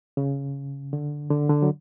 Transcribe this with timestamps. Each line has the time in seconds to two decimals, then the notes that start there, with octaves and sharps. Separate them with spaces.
0.17 C#3
0.93 D3
1.31 D3
1.49 D3
1.62 F#3